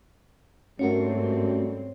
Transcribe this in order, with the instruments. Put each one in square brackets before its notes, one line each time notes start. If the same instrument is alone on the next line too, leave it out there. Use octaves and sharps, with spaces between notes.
[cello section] G#2 C4 [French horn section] G3 A3 [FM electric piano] C#4 F#4 A#4 [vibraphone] C#5